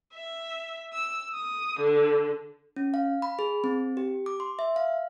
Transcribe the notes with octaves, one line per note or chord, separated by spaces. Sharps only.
E5
E6
D#6
D3
C#4
F5
B5
G#4
C4
G4
D6
C6
E5
F5